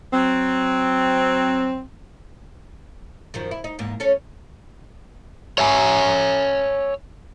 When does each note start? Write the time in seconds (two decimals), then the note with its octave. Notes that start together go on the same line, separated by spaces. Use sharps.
0.13 F#3 C4
3.34 F#2 D#3 F3
3.51 E4
3.64 D#4
3.79 E2 G#2 A#3
4.00 C#4 A4 C#5
5.58 C#5 E5 G#5